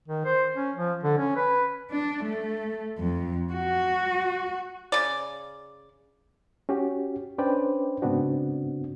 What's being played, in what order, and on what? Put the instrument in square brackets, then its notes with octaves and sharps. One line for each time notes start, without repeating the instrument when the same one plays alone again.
[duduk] D#3
C5
C#4
F3
D3
C#4
B4
[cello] D4
A3
F2
F#4
[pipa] C#3 D5
[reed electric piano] C#4 F#4 G4
C#4 D4 B4 C5 D5 G5
G#2 C#3 B3 C4 D4 F#4